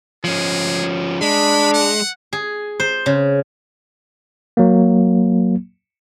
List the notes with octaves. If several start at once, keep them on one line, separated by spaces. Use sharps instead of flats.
F3 C#4 G#4
G#3 D4 B5
F#5
G#4
C5
C#3
F#3 A#3